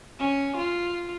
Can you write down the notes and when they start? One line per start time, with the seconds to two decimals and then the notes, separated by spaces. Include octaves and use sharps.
0.19 C#4
0.56 F4